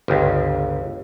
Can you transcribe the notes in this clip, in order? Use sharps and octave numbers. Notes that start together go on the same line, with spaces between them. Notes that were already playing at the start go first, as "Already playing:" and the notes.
G1 C#2